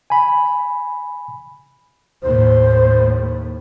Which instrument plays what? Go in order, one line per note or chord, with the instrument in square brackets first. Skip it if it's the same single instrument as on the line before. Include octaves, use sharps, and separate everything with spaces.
[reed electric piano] G#5 B5
[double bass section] D#2 A2 [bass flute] C5